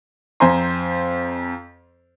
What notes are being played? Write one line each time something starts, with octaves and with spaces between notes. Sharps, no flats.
F2 C4 C5 G#5 A#5 C6